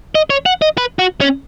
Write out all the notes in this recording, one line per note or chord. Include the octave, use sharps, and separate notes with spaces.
D#5
C#5
F#5
D#5
B4
F#4
C#4